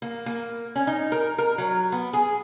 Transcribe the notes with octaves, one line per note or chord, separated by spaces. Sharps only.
A#3
A#3
C#4
D#4
A#4
A#4
F#3
B3
G#4